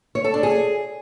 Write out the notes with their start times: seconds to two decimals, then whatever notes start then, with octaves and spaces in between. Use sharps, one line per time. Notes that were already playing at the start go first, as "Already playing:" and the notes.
0.15 C#5
0.24 A4
0.34 D4
0.43 G#4